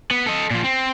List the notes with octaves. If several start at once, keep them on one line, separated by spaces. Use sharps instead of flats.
B3
A4 D#5
A#2 F3
C4